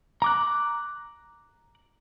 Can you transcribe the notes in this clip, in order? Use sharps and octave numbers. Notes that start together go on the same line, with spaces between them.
A#5 D6 F#6